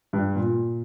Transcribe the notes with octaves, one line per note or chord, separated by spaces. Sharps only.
G2
A#2